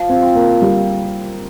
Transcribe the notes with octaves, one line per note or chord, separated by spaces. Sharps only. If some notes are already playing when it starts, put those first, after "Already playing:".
Already playing: F3
C4
C4
A#3
G3